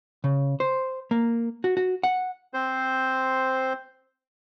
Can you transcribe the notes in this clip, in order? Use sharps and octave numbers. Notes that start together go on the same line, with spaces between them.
C#3
C5
A#3
F#4
F#4
F#5
C4 C5